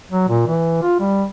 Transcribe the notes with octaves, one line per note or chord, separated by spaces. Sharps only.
F#3
A#2
E3
F4
G3